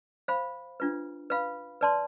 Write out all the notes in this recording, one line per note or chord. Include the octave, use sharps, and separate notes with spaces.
C5 F5 B5
D4 F4 B4
B4 F5 B5
B4 D5 A5 C6